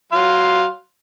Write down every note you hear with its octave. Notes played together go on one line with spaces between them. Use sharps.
F#3 F5 C6